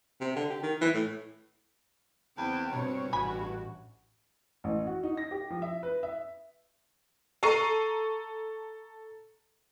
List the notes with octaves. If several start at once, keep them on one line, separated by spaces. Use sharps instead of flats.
C3
D3
G4
D#3
E3
A2
E2 C4 G5
G2 B2 C4 C#5
A1 F#4 G#5 B5
A1
F#4
D#4
A#6
G4
F3
E5
B4
E5
A4 A#5 C#6 C7 D#7